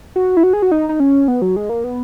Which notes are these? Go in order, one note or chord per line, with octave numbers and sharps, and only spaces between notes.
F#4
E4
F#4
G#4
F#4
D#4
D#4
C#4
B3
F#3
G#3
A#3
B3